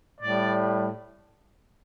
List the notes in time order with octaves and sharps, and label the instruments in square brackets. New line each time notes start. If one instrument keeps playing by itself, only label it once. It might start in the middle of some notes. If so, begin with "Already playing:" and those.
[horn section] A2 G3 D5